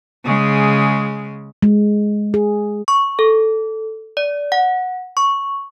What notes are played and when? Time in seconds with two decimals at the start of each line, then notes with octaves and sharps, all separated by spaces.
0.25 C#3 G#3
1.63 G#3
2.34 G#4
2.88 C#6
3.19 A4
4.17 D5
4.52 F#5
5.17 C#6